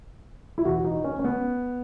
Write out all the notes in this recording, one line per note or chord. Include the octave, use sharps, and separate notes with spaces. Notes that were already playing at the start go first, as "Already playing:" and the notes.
E4
E2 B2 F#4
D#4
C#4
C#4
B3